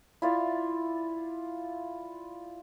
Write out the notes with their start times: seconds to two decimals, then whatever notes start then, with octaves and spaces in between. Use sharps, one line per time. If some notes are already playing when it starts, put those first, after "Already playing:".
0.22 E4 F4 D5 E5